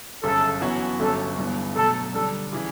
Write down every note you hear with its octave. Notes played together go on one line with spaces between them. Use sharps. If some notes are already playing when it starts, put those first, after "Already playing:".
G1 F#2 C#3 A4
F#2 E3 B3 F#4 C#5
G1 G2 F#3 C#4 F#4 A4
G1 G2 E3 B3
B2 F#3 A3 A4
D3 G3 D4 A4
C#3 E3